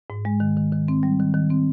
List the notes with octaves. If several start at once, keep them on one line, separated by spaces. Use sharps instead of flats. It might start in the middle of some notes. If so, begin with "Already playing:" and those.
G#2
G#3
D#3
D#3
D#3
C4
G3
D#3
D#3
C4